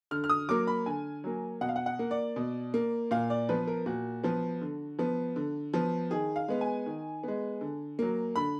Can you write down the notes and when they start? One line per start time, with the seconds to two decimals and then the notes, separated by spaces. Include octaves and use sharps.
0.11 D3 F6
0.24 F6
0.29 D#6
0.49 F#3 A#3 D6
0.67 B5
0.86 D3 G#5
1.24 F#3 A#3
1.61 B2 F#5
1.69 F5
1.76 F#5
1.86 F#5
1.99 A#3
2.11 D5
2.36 B2
2.74 A#3
3.11 A#2 F5
3.30 D5
3.49 F3 B3 B4
3.67 A#4
3.86 A#2 F#4
4.24 F3 B3
4.61 D3
4.99 F3 B3
5.36 D3
5.74 F3 B3
6.11 D#3 G#4
6.36 F5
6.48 G#3 B3
6.61 G#5
6.86 D#3
7.24 G#3 B3
7.61 D3
7.99 F#3 A#3
8.36 D3 B5